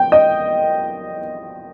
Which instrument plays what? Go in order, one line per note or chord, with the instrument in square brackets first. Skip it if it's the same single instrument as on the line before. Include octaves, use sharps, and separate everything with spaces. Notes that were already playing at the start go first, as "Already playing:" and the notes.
Already playing: [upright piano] G5
D#5